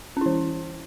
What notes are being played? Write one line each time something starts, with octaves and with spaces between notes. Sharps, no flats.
E3 C#4 E4